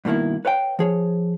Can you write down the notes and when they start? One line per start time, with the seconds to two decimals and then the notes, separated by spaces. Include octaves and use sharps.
0.05 G2 B2 D#3 A#3 E4
0.45 B4 C#5 F5 G5
0.79 F3 G#4 C#5